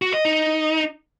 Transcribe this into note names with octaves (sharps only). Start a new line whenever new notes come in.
F#4
D#5
D#4